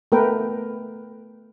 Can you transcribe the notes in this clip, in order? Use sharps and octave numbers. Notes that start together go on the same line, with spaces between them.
A3 B3 A#4 B4 G5